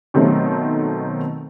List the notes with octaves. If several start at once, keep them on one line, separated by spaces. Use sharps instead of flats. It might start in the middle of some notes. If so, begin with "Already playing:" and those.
B2 D#3 F#3 A3 C4